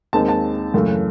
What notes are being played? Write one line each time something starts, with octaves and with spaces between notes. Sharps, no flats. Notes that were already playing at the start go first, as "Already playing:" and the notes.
D#2 D#3 G#3 C4 D#4 A5
A5
F#2 C#3 E3 A3